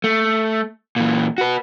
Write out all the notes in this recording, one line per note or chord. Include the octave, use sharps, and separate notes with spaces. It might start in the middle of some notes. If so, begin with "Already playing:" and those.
A3
A#2 E3
F#4 B4